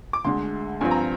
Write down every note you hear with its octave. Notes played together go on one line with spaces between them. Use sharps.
D6
D2 D3 G#3 C6
G2 F3 C4 G#5
A#5